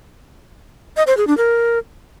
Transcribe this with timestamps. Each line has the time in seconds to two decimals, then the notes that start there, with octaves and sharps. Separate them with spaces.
0.97 D#5
1.07 C5
1.17 G#4
1.27 D4
1.38 A#4